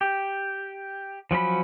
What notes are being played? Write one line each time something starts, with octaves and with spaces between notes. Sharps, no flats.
G4
F3 F#3 C#4 B5